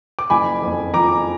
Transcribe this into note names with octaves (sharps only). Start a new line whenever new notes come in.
D6
F#1 G#5 B5
F2
F3 A#5 D6